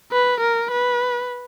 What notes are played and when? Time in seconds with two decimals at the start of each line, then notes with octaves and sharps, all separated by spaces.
0.13 B4
0.41 A#4
0.71 B4